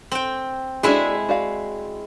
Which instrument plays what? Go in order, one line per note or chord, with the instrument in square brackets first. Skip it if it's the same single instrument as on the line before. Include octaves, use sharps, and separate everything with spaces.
[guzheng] C4 G5
[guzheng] G#3 E4 E5 [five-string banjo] D4 F#4 G#4
[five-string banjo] F#4 D5 F5